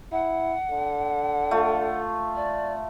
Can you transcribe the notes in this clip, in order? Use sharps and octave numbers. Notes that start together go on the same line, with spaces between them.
E4 F#5
D3
A3 F4
D5